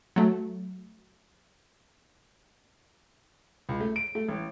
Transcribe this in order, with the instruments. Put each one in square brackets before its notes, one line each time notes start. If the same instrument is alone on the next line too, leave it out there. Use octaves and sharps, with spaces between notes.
[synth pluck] F#3 A3
[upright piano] C#2
A3
D7
A3
A1